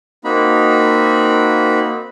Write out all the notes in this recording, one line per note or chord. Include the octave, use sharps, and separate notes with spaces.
A#3 C4 D#4 F#4 B5